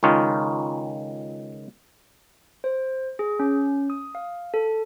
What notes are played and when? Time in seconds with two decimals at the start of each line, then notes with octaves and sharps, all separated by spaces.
0.03 C#2 D#3 C#4 D#4 F4
2.64 C5
3.19 G#4
3.39 C#4
3.90 D#6
4.15 F5
4.54 A4